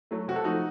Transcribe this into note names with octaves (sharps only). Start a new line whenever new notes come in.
F#3 A3
C3 F#4
A4
F3 A3 D#4 F#4